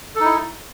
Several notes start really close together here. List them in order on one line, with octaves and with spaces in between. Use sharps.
A4 D#4 E4